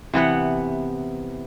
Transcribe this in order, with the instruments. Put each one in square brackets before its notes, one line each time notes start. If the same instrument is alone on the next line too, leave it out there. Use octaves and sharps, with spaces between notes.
[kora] C3 E3 B3 F#5